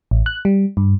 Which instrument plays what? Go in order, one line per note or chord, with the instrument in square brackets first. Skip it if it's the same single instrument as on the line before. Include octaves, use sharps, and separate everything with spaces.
[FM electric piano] A1
F#6
G3
G2